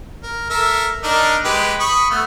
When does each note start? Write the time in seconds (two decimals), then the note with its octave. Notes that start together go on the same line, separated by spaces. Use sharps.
0.23 A#4
0.50 A4 A#4 E5
1.03 D4 D#4 A#4
1.45 G#3 G4 B4
1.80 B5 C#6 D#6
2.10 A3 B3